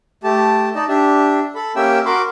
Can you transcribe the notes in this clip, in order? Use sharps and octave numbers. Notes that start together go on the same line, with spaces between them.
A3 G4 A5
D#4 D5 D#5 A5
D4 G4 E5
A4 B5
A#3 C#4 G4 E5 G5 E6
F#4 A#4 B5 C6 D6